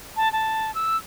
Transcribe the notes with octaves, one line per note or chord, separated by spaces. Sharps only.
A5
A5
E6